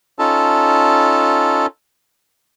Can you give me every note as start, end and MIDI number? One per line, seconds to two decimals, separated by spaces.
0.19 1.66 61
0.19 1.66 63
0.19 1.66 65
0.19 1.66 69
0.19 1.66 81